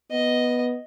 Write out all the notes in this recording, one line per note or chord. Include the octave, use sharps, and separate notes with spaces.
B3 D#5